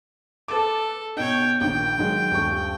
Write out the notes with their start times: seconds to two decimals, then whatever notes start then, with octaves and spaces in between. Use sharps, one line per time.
0.48 A4 B4 A5 D6
1.17 B2 D#4 C#5 G5
1.61 A#1 D#3 G5
1.98 D#3 F#3 G#3
2.31 D#1 G2 C#6